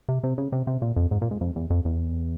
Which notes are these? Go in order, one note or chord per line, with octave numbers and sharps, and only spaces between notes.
C3
C3
C#3
C3
C3
A#2
F2
G#2
A#2
G#2
F2
E2
F2
E2